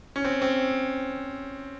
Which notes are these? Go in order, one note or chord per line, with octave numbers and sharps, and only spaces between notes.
C#4
C4
C4